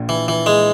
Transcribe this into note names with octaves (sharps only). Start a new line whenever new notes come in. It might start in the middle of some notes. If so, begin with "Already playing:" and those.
Already playing: A#1 A#2
E3
E3
G#3